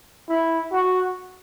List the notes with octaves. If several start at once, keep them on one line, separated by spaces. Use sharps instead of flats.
E4
F#4